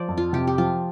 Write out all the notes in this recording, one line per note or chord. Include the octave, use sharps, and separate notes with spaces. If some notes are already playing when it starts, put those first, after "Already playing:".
Already playing: F3 C5 D5
F2
F4
C3 G4
G4
F3 F4